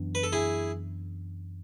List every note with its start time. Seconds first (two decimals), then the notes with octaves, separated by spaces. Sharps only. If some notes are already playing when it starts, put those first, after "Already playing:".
Already playing: F#2 E3 B3 D4
0.15 B4
0.23 A4
0.33 E4 G#4